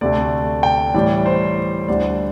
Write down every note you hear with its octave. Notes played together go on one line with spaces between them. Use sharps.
D2 C3 A3 D5
G5
A2 E3 G3 D5
C5
D2 D3 G3 D5